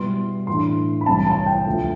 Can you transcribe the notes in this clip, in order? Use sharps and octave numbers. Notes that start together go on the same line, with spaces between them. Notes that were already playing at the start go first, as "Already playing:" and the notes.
Already playing: B2 G3 B3 E4 C6
A2 E3 A3 D4 C6
B5
C2 C3 E3 G3 A5
A5
G5
D2 C3 F3 A3